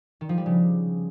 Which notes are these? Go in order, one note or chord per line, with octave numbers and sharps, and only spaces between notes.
D#3
F3
G3
C#3